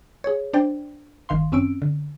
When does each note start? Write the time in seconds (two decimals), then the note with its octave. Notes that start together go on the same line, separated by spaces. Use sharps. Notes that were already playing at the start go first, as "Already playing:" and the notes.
0.24 G#4 C#5
0.53 D4 C5 D5 G5
1.29 G1 D#3 F5 C6
1.52 F#2 C4 C#4 E6 D7
1.82 D3